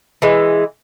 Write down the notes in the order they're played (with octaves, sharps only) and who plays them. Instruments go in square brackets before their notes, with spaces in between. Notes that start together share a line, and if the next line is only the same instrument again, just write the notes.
[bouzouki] E3 G#3